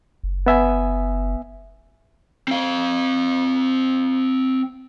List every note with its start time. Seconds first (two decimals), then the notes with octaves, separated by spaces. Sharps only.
0.23 F#1
0.46 B3 E5 G#5
2.48 C4 F5